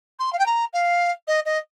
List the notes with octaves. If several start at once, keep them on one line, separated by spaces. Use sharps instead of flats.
C6
F5
G5
A#5
F5
D#5
D#5